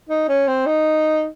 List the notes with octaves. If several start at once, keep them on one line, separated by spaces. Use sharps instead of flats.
D#4
C#4
C4
D#4